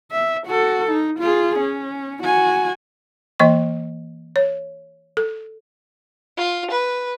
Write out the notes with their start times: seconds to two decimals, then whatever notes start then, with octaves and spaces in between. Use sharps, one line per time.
0.11 E5
0.47 F#4 A4
0.91 D#4
1.19 F4 G#4
1.59 C#4
2.23 F#4 G#5
3.40 E3 A#3 D#5 C#6
4.36 C#5
5.17 A4
6.37 F4
6.70 B4